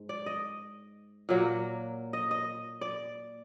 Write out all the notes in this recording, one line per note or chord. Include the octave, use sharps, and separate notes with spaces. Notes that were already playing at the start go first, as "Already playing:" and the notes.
Already playing: G#2
D5
D#5
A#2 F#3 A#3
D#5
D#5
D5